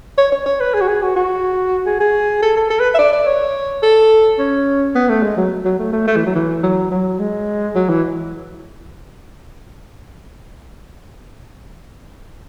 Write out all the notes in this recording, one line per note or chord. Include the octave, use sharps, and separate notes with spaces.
C#5
C#5
C#5
B4
G#4
F#4
G#4
F#4
F#4
G#4
G#4
A4
A4
A4
B4
E5
D5
D5
C#5
A4
C#4
B3
A3
G#3
F#3
F#3
A3
A3
A3
E3
F#3
E3
F#3
F#3
G#3
F#3
E3